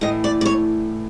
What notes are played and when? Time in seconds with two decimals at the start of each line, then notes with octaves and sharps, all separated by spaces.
0.01 A2 E3 D#5
0.24 D5
0.41 D5
0.45 C#5